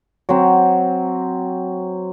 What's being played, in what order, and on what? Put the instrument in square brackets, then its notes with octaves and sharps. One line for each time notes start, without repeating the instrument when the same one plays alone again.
[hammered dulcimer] F#3 C4